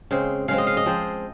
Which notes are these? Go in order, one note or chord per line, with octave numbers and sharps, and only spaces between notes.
C#3 G#3 C4
C#3 G#3 C4 F5
D#5
F5
D#5
F3 G#3 C4